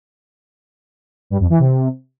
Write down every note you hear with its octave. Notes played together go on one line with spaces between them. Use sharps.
G2
F2
E3
C3